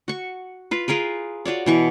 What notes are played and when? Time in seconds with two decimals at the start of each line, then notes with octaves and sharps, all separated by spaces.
0.08 F#4 C#6
0.71 F4 B4
0.88 F4 G#4 A#4 B4
1.45 F4 F#4 C#5 D5
1.66 B2 E3 C#6